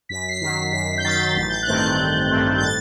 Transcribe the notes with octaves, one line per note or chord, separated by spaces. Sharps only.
F#2 B6
C7
D#3 F#3 B6
F#2 B6
G6
D#3 F#3 A6
A1 A6
G6
F#6
G2 D#3 A3 C4
G6
A1
G2 D#3 A3 C4
G6
A2 A6